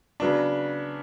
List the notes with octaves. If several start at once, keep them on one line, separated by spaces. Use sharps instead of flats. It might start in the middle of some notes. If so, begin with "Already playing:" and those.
C#3 F#3 B3 D4